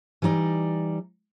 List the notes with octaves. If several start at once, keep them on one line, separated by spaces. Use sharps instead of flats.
E3 G3 D#4 D5